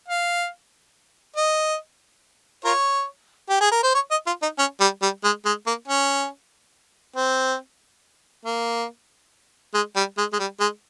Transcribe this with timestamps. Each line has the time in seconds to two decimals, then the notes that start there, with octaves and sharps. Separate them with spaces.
0.08 F5
1.36 D#5
2.65 F4 A#4 C#5
3.49 G4
3.61 G#4
3.72 A#4
3.83 C5
3.94 C#5
4.11 D#5
4.27 F4
4.42 D#4
4.58 C#4
4.81 G3
5.02 G3
5.24 G#3
5.45 G#3
5.67 A#3
5.88 C#4
7.16 C4
8.45 A#3
9.74 G#3
9.96 G3
10.18 G#3
10.33 G#3
10.39 G3
10.60 G#3